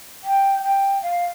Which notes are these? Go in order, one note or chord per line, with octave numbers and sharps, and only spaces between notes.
G5
G5
F5